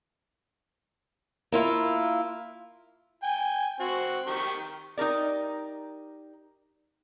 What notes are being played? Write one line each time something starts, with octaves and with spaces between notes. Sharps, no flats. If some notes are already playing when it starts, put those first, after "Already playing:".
A#3 E4 F4
G5 G#5
C4 F#4
D#3 G4 C#6
D#4 G4 A#4 D5